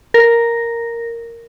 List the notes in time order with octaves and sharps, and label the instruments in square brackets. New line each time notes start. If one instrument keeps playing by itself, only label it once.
[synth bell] A#4 A#6